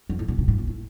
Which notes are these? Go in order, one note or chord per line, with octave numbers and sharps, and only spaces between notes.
F2
A2
A#2
B2
A2
A#2
A2